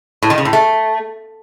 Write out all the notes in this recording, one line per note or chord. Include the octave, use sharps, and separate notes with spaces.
A2
D#3
C#3
A2
A3